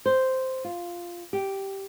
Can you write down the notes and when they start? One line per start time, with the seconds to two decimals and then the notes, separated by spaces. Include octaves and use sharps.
0.06 C5
0.64 F4
1.33 G4